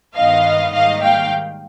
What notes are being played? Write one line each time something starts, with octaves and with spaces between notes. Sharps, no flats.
G2 D#3 G#3 B3 D#5 F5
G#2 D#3 G3 A#3 D#5 F5
F5 G5